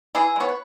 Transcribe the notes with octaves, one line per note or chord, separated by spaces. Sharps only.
E3 E4 G#4
G#3
B3 C#5
B4